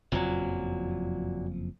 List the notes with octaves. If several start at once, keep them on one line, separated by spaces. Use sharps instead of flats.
F#1 F2 A#2 F3 F#3